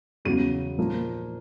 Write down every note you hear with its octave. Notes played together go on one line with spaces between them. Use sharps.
E2 C#3 F#3 D#7
A#2 F3 A#3